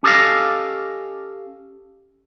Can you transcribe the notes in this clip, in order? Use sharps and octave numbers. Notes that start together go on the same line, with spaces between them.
C#4 G4 A4 D#5 F5